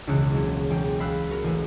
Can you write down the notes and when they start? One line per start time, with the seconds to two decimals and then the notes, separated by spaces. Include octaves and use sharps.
0.07 E1 C#2 C#3 E4 F#6 C#7
0.33 F#3 A#3 E4
0.70 E1 G5
1.00 F5 B5 E6 F#6
1.30 F#4 A#4 A#5
1.44 A1 B4